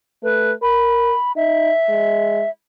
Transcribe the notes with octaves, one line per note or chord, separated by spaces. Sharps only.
A3 B4
A#4 B5
D#4 E5
G#3